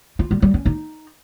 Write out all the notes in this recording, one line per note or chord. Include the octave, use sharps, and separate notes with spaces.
F4
G3
G3
C#4
D#4